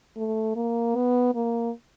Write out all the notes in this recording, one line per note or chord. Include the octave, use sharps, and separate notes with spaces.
A3
A#3
B3
A#3